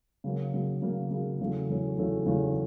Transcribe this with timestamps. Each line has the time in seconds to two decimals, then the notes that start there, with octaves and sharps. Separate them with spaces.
0.24 C#3 F#3 A#3
0.54 C#3 F#3 A#3
0.82 C#3 F#3 A#3
1.10 C#3 F#3 A#3
1.40 E2 C#3 F#3 A3 C#4
1.69 E2 C#3 F#3 A3 C#4
1.98 E2 C#3 F#3 A3 C#4
2.26 E2 C#3 F#3 A3 C#4